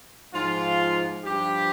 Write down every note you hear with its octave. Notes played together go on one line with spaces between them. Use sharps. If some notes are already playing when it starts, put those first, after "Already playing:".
G#2 F3 F4
G2 F3 G4